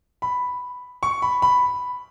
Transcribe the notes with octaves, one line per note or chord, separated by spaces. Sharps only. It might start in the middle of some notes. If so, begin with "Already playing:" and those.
B5
C#6
B5
B5